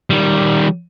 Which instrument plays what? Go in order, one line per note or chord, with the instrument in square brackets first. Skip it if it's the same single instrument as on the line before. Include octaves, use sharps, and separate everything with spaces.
[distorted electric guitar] D#3 G3